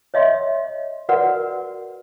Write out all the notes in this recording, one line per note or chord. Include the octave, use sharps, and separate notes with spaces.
C#5 D#5 E5 C6
F#4 A#4 B4 D5 F#5